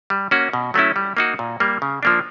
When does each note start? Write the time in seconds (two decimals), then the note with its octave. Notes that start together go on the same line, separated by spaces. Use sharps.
0.10 G3
0.31 A#3 C#4 F#4
0.53 B2
0.74 F#3 A3 C#4 E4
0.96 G3
1.17 A#3 D#4 F#4
1.39 A#2
1.60 G3 A#3
1.82 C#3
2.03 F3 A#3 D4